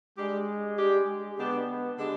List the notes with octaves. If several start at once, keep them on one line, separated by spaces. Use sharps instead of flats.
G3 G#3 D4 G4
G3 D4 G4
D3 G#3 B3 D4 G4
B3
D3 G#3 D4 G4